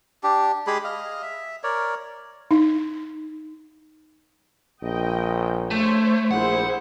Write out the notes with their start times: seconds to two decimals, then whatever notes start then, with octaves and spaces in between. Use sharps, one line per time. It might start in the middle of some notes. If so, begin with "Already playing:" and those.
0.23 D4 G4
0.67 G#3 G4 G#4 B5
0.84 D#5 F5
1.22 E5
1.63 A#4 C#5 D5
2.51 D#4
4.83 A#1 D#5 G5
5.71 A3 C5 C#5
6.31 A#1 E4 G#4 C5 F#5